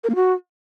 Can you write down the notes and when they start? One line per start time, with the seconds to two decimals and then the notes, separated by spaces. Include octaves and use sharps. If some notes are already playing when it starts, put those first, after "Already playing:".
0.04 A#4
0.09 A#3
0.15 F#4